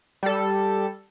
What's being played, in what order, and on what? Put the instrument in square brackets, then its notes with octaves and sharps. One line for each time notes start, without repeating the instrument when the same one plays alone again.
[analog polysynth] G3 A4